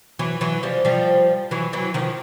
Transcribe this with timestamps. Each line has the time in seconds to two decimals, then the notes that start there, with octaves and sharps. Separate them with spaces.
0.19 E3 F#3
0.41 E3 F#3
0.63 F3 G3
0.85 F3 G3
1.51 E3 F#3
1.73 E3 F#3
1.94 D#3 F3